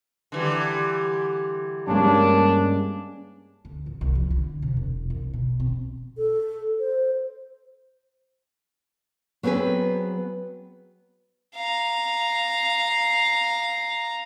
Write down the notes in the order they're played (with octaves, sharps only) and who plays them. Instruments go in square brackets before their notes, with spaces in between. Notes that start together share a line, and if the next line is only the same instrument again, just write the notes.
[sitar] D3 E3 G3
[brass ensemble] G2 [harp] G#3 A#3 C#4 [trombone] D4
[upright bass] D2
A1
C2
F3
D3
C3
E1
C2
B2
C4
[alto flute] A4
C5
[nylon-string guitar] F#3 B3 C4 G#4 B4
[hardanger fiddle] F5 A#5